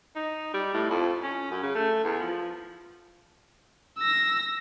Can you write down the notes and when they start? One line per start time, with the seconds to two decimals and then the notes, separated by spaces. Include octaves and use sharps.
0.16 D#4
0.53 G3
0.74 A2
0.90 F2
1.23 C#4
1.51 F#2
1.63 C#3
1.75 A3
2.04 E2
2.20 F3
3.98 E6 A#6